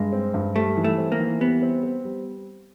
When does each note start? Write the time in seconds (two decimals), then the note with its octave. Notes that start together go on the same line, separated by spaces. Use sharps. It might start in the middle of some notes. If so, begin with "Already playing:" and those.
Already playing: G2 G#3
0.13 C4
0.34 G2
0.56 G3 A3
0.77 E3
0.84 A3
0.98 C4
1.12 A#3
1.20 E3
1.40 G3 B3
1.62 C4
1.83 C4
2.05 G3